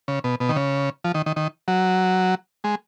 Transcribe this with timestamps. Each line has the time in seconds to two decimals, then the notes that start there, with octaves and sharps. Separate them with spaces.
0.08 C#3
0.24 B2
0.40 B2
0.49 D#3
0.56 C#3
1.04 F3
1.14 D#3
1.26 D#3
1.36 D#3
1.68 F#3
2.64 G#3